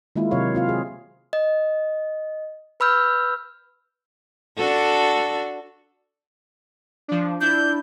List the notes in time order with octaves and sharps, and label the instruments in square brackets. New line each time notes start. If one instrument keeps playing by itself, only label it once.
[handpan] D#3 G#3 A#3 E4 F4
C3 F#3 C#5 F5
C4 F4 F5
G#4
[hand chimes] D#5
B4 B5 E6 F6 G6
[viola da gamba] D4 F#4 A4
[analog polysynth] F3 D4
[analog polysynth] D4 E4 [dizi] G6